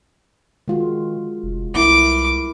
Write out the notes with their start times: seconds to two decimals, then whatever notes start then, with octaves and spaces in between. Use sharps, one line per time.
0.68 D#3 G#3 F4 F#4
1.43 F1
1.74 C2 B3 E4 A#4 D6